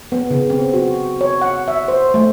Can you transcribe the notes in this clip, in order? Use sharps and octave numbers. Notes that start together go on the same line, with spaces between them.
B3
C#3
C4
F#4
C#5
F#5
E5
C5
A3